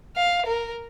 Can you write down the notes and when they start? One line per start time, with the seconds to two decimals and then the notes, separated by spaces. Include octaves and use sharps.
0.16 F5
0.46 A#4